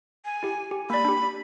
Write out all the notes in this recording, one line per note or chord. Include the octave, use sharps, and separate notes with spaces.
G#5
E4 G4
G4
A#3 D5 B5
D4 G4